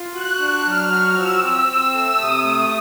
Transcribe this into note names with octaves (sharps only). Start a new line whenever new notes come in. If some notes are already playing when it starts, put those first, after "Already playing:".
Already playing: F4
F#4 F#6
D4
F#3 F6
F#4
F3 E6
C4
C4
A3
C3 D#6
A3